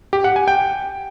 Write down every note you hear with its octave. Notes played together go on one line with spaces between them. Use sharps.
G4
F#5
G#5
G5